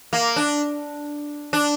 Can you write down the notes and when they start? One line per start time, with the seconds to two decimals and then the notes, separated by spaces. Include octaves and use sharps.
0.13 A#3
0.36 D4
1.53 D4